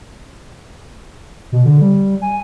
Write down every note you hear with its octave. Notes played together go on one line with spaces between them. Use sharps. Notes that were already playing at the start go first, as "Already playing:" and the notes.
B2
D3
G3
G#5